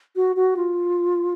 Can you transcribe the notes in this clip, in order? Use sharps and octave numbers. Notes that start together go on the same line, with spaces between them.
F#4
F#4
F4